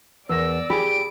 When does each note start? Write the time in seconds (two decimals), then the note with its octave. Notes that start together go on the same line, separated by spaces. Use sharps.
0.29 E2 A#4 D5 E6 A#6
0.70 G4 G#4 B5 D7